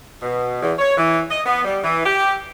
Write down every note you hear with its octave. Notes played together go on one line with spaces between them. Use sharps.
B2
E2
C#5
E3
D#5
B3
G3
E3
G4